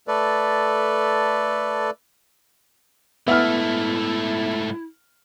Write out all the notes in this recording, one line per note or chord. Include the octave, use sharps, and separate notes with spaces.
A3 A4 B4 D5
G#2 A3 B3 E4 E5 F6